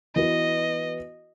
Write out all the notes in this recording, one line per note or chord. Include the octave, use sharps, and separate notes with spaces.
E3 B3 F#4 B4 D#5